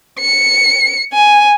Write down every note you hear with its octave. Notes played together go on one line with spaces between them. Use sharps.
C#7
G#5